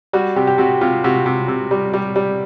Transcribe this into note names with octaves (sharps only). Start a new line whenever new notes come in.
G3 F#4
C3 G4
G4
C3 F#4
C3 F4
C3 F#4
C3
C3
G3
G3
G3